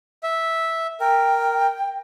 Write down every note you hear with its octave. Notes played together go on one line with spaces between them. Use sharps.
E5
A#4 G5